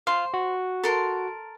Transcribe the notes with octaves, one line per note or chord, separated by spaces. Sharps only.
C5 F5 C6
F#4
A4 A#4 C6